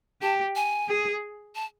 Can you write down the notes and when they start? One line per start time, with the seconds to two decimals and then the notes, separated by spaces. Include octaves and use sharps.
0.22 G4 A5
0.56 G#5
0.89 G#4
1.55 A5